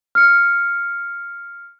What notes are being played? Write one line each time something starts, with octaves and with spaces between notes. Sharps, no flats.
F6 C#7